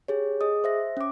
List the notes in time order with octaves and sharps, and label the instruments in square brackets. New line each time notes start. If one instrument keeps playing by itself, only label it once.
[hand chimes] G4 G#4 C#5
G#4 D#5 D#6
C5 E5 A#6
C#4 D6